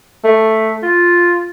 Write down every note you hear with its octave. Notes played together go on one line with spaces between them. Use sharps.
A3
F4